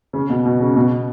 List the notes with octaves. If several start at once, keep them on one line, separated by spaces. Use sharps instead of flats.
C#3
B2
B2
C#3
B2